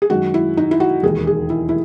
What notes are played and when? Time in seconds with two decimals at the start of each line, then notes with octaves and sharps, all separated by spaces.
0.02 G#4
0.10 F#2 D#3 G#3 F#4
0.34 E4
0.57 D#4
0.71 E4
0.80 F#4
1.03 E1 D#2 D#3 G#4
1.27 G#4
1.50 E4
1.69 E4